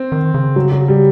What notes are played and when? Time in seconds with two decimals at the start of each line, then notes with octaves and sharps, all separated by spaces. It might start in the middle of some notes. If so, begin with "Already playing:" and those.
Already playing: C4
0.12 D#3
0.34 C#3
0.56 F#3
0.72 F#3
0.88 G3